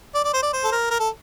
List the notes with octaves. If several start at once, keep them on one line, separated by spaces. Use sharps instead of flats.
D5
D5
C5
D5
C5
A4
A#4
A#4
A4